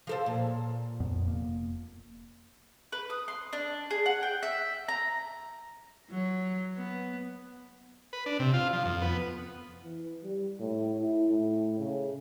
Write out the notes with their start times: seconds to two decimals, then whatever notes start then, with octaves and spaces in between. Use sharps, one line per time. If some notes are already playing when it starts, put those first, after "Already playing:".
0.07 F3 A4 C5
0.26 A#2
1.00 F2 B3
1.24 F1 A#3
2.92 B4
3.10 D#6
3.28 C6
3.53 D4
3.91 G#4
4.06 F#5
4.23 G5
4.43 E5
4.88 A#5
6.11 F#3
6.76 B3
8.13 B4
8.26 D4
8.39 C3
8.54 F4
8.73 F3
8.85 F2
9.02 B3
9.83 E3
10.23 G3
10.59 A2
11.01 E4
11.29 A2
11.79 C#3